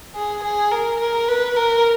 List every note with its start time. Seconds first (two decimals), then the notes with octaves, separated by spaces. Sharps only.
0.15 G#4
0.43 G#4
0.71 A#4
1.00 A#4
1.28 B4
1.56 A#4